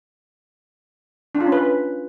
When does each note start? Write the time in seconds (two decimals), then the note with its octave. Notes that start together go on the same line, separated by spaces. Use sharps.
1.35 D4
1.40 F4
1.46 C#4
1.52 B4